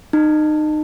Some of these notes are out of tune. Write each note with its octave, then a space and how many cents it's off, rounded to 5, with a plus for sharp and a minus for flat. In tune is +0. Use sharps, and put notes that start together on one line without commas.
D#4 -30